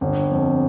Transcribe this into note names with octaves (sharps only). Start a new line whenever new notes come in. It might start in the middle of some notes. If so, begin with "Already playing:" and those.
G1
F2